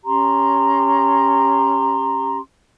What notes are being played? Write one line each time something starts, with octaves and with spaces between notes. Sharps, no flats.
C#4 G4 A#5 C6